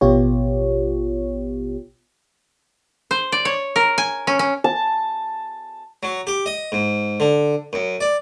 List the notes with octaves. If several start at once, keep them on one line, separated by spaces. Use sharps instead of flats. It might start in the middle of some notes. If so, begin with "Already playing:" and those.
A1 B2 B3 F4 G4 C#5
C5
D5
C#5
A#4
G#5
C#4
C#4
A5
F#3
G4
D#5
G#2
D3
F#2
D5